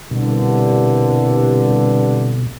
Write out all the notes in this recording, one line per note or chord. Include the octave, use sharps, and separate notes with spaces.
C2 G2 B2 D3